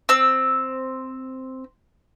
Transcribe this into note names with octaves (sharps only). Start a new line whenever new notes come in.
C4 E6